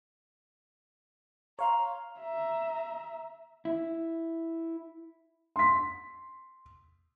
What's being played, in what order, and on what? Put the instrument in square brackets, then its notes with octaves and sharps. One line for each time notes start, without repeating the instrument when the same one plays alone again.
[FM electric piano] C#5 F5 C6 [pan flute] A#5
[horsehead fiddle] E5 A#5
[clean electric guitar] E4
[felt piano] C6 B6